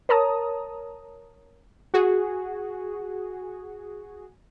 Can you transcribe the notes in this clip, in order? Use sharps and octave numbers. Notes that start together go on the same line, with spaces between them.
A#4 C#5 A5 A#5 D#6
F#4 G#4